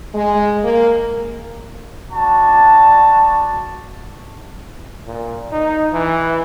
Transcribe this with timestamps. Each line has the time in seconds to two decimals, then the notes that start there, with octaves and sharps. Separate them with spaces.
0.14 G#3
0.63 A#3
2.11 D4 F#4 A5
5.07 A#2
5.52 D#4
5.93 E3